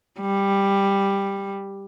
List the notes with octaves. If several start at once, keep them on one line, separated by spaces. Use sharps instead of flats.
G3